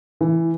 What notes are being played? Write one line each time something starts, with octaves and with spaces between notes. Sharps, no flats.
E3